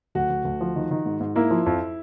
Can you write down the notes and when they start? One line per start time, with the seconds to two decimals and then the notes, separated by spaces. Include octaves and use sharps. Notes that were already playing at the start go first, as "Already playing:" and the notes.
0.15 D2 F#4
0.30 D2
0.45 D2
0.61 F3
0.76 D#3
0.91 D#3
1.06 G#2
1.20 G#2
1.36 A#3 E4
1.51 F3
1.66 F2